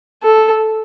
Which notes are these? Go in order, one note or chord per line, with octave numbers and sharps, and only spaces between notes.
A4